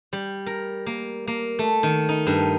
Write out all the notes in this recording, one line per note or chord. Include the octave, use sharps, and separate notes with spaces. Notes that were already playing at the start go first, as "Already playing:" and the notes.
G3
A#4
A#3
A#3
A3
D#3
D#4
G2